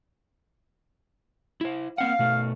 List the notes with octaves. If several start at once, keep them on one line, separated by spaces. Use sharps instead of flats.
E4 C5
A#3 C4 F5 F#5
B2 A3